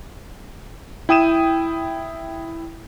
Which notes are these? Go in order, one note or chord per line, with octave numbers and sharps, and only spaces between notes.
E4 G5 D#6 D#7 E7